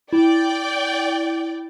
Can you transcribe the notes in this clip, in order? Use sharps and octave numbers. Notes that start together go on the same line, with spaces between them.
E4 D5 G5